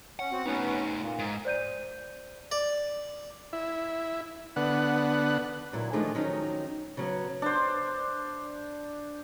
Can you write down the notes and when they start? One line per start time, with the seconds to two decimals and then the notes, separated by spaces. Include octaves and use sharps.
0.19 C#4 F#5
0.32 C4 F#4
0.46 A3 B3 C#4 D#4 B4
1.01 A#2
1.19 G#2
1.45 C5 D5 G6 D#7
2.52 D5
3.53 E4
4.56 D3 B3 F#5
5.73 A#2 F#3 E4
5.93 D#3 F3 G#3 A3 D4 D#4
6.15 D#3 F3 F#3 C#4 D#4
6.97 C#3 F#3 B3
7.42 D4 C5